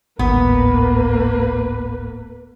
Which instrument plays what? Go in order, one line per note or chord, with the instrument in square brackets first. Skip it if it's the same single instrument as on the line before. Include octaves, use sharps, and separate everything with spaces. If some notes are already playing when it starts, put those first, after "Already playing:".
[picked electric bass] D1 G#1 [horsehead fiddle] A#3 B4 [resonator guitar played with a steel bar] B3